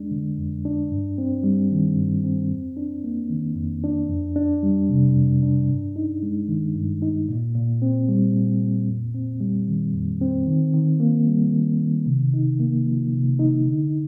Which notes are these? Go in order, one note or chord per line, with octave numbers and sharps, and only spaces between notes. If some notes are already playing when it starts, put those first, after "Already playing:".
Already playing: F2 G#3 D4
D3
F2
D4
G2
C4
G3
D#3
G2
C4
F2
D4
A#3
D#3
F2
D4
F2
D4
G3
C3
F2
D4
G2
D#4
G#3
D#3
G2
D#4
A#2
A#2
C4
G3
A#2
A#2
F2
C4
G3
D#3
F2
C4
D#3
D#3
A#3
G3
D#3
D#3
C3
D#4
A#3
F3
C3
D#4
D3